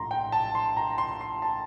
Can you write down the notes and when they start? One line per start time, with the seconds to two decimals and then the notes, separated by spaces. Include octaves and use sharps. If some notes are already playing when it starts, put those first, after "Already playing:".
Already playing: A#1 A2 F3 A#5 C6
0.11 G5
0.32 A5
0.55 C6
0.77 A#5
0.98 C6
1.21 C6
1.42 A5